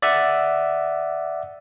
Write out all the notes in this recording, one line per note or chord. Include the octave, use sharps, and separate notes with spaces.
D5 E5 F#5